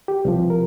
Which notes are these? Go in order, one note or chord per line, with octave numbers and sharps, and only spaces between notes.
G4
C2 C3 F3
A#4